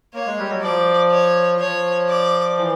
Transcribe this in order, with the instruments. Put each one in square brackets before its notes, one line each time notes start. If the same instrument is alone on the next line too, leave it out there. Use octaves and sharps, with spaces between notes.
[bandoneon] A#3 [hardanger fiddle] C#5
[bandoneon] G#3
G3
F#3
[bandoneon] F3 [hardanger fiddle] D5
[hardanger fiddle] C#5
[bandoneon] F3 [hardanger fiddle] C#5
[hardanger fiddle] D5
[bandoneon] E3